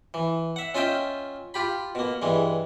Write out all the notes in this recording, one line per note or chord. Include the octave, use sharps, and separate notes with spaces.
E3
E5 F#5
C#4 F4 D#5 E5 G5
F4 G4 B5
B2 A#3
G2 E3 G#3